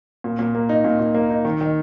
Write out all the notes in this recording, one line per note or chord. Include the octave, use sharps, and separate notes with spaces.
A#2
A#2
A#3
D#4
A#2
A#2
A#3
D#4
D#3
D#3